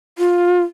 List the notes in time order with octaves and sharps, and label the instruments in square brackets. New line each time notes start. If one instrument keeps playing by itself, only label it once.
[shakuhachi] F4